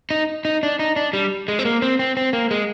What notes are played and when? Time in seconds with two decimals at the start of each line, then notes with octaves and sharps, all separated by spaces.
0.11 D#4
0.45 D#4
0.63 D4
0.79 D#4
0.96 D4
1.13 G3
1.48 G#3
1.59 C4
1.65 A#3
1.82 C4
1.99 C4
2.17 C4
2.33 A#3
2.51 G#3